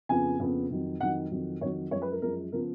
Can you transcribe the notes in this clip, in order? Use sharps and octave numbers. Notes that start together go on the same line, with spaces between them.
F2 C#3 F3 B3 G#5
F2 C#3 F3 B3
F2 D#3 F#3
F2 D#3 F#3 F#5
F2 D#3 F#3
F2 D#3 F#3 C#5
F#2 F3 G#3 C#5
B4
A#4
F#2 F3 G#3 A#4
C#3 F3 B3 A#4